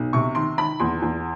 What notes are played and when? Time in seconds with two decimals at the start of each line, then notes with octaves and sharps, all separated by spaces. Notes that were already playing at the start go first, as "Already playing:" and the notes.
Already playing: B1
0.13 C3 C#6
0.35 D#3 C6
0.58 D#3 B5
0.80 E2 C6
1.02 E2